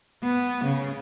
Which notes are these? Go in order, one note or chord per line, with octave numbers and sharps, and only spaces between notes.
B3
C#3